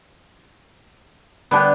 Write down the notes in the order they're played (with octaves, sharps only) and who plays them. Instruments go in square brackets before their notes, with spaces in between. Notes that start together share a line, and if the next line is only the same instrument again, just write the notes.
[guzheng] D3 G3 [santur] B3 D4 G5